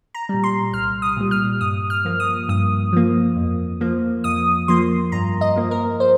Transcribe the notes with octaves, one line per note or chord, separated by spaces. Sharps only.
A#5
A#2 G3
C6
C2 F6
D#6
A#2 G3
F6
G2 D#6
F6
F3 A#3
D#6
G2 D#6
F3 A#3
F2
F3 A#3
F2 D#6
F3 A#3 C6
G2 A#5
D#5
F3 A#3
A#4
C5